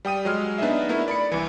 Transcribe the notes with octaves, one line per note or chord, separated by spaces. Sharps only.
G3 G5 D#6 D#7
F#3 G#3 F6
B3 D4 D#4 G#4 D#5 E5
A3 B3 D4 E4 A#4
D5 B5 C#7
C2 E3